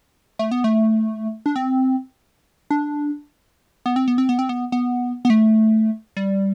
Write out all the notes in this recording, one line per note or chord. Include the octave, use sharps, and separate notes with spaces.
A3
B3
A3
D4
C4
D4
B3
C4
B3
C4
B3
C4
B3
B3
B3
A3
G3